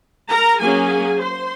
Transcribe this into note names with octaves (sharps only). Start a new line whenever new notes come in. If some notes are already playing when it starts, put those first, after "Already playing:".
A#4 A#5
F#3 A#3 C#4 G#4 G#5
C5 C6